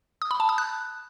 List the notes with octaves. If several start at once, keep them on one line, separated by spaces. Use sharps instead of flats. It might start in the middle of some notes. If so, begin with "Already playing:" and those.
D#6
B5
A5
D#6
F#6